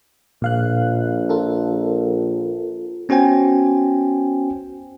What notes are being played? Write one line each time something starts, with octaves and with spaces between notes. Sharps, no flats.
A#1 A#2 F5 F#6
F4 A4 A#4
B3 C#4 F#4 C5 G5 G#5